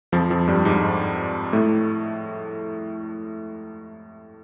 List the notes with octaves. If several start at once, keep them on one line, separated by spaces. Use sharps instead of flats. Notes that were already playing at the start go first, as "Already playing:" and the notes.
F2 F3
F2 F3
G2 G3
G#2 G#3
A2 A3